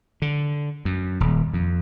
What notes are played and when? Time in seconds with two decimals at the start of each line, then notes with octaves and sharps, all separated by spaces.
0.22 D3
0.85 F#2
1.20 D#1
1.53 F2